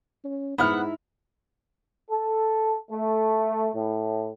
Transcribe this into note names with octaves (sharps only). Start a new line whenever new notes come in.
C#4
G#2 B3 D#4 E4 E5 F#5 B5 F6
A4
A3
A2